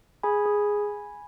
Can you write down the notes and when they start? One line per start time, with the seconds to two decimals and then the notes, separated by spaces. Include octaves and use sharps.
0.23 G#4 G#5 B5
0.46 G#4